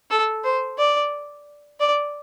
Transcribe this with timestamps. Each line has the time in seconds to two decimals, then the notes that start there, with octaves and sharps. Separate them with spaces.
0.10 A4
0.44 C5
0.78 D5
1.80 D5